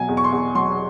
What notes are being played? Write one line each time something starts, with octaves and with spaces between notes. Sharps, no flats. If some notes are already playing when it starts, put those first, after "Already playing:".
Already playing: B2 F#3 G#5
E2
C#6
C6
E2
F#3 C6